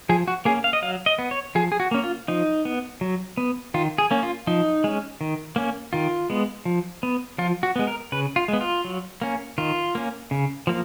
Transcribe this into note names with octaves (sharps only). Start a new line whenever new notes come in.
F3 G#4
F#4
A#3 C#4 G#4
F5
D#5
F#3 F5
D#5
B3
C#5
F3 G#4
G#4
F#4
A#3 C#4
F4
F3 D#4
B3
F#3
B3
D#3 F4
G#4
A#3 C#4
F4
F3 D#4
G#3 C#4
D#3
A#3 C#4
D#3 F4
G#3 B3
F3
B3
F3 F4
F#4
G#3 B3
A#4
C#3 B4
F4
G#3 B3
F4
F#3
A#3 C#4
D#3 F4
A#3 C#4
C#3
F3 A#3